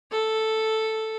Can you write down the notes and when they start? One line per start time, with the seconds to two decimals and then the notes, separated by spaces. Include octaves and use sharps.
0.12 A4